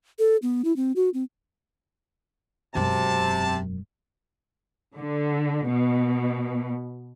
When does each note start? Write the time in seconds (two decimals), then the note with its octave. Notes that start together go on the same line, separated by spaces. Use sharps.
0.19 A4
0.42 B3
0.65 E4
0.76 C4
0.96 F#4
1.14 C4
2.75 E1 F#2 C3 A5
4.95 D3
5.67 B2